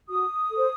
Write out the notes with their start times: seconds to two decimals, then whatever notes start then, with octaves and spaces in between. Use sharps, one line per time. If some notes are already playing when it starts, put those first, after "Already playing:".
0.08 F#4 D#6
0.51 A4 C5